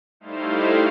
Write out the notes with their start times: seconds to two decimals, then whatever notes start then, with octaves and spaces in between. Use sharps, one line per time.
0.20 G3 A3 D#4 E4 C5 F5